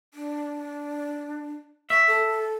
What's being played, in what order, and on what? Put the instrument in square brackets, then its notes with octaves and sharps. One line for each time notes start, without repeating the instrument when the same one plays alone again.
[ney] D4
[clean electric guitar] E5 [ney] C#6
[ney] A4